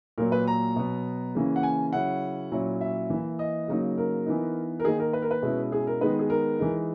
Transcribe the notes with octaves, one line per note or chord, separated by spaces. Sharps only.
A#2 F#3 A#3 A#4
B4
A#5
B2 F#3 B3
C#3 E3 A#3 C#4
F#5
G#5
C#3 F#3 C#4 E4 F#5
A#2 F#3 C#4 E4
E5
E3 A#3 E4
D#5
C#3 F#3 A#3 D#4
A#4
E3 B3 D#4
A#4
D#3 A#3 D#4 G#4
A#4
B4
A#4
B4
B2 G#3 C#4 E4
G#4
A#4
D#3 G#3 B3 D#4 B4
G#4
A#4
E3 G#3 D#4